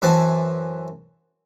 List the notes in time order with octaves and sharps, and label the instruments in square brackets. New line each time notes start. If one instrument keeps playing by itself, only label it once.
[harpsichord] F#2 E3 C4 F#5 G#5 A5